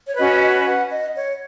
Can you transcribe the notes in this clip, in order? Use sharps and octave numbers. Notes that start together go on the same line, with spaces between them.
C#5
C#4 F#4 B4 D#5
D#5
F#5
D#5
C#5